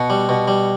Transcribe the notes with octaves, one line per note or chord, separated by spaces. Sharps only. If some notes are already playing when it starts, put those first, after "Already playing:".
Already playing: B2 F#5
G3
B2
G3